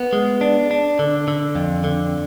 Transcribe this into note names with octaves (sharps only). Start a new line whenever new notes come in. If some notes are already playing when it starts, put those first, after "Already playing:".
Already playing: B3
G#3
D4
D4
D3
D3
F2
D3